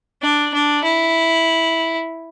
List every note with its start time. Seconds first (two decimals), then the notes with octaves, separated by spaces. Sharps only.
0.22 D4
0.54 D4
0.84 E4